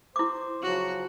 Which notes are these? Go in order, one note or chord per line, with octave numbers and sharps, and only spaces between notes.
E4 C5 D6
C#3 F3 F#3 F#4